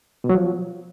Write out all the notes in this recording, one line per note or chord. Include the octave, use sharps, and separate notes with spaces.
B2
F#3
F3